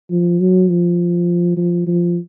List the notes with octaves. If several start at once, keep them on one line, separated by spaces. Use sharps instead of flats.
F3
F#3
F3
F3
F3